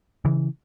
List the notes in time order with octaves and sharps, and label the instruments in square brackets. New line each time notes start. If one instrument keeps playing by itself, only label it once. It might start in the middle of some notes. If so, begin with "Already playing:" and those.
[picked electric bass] C#3 E3